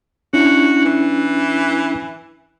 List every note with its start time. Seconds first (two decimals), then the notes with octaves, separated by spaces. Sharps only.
0.33 C#4 D4 E4 F#4
0.85 E3